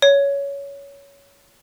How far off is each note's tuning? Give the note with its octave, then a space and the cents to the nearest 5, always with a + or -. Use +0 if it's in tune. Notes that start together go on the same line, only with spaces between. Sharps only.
C#5 +15